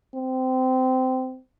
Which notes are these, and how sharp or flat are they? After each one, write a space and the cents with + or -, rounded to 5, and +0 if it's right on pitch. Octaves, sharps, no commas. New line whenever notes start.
C4 -20